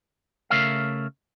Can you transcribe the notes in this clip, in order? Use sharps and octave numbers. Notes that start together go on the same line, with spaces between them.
C#3 A3 A#4 C#5 E5 F5